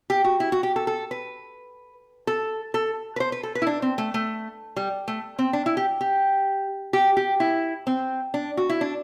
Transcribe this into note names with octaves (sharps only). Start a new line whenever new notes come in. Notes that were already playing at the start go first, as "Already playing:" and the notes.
G4
F#4
E4
F#4
G4
A4
A4
B4
A4
A4
B4
C5
B4
A4
B4
E4
D4
C4
A3
A3
G3
A3
C4
D4
E4
G4
G4
G4
G4
E4
C4
D4
F#4
E4
D4